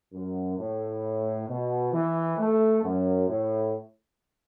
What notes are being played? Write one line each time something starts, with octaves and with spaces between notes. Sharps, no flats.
F#2
A2
B2
E3
A3
F#2
A2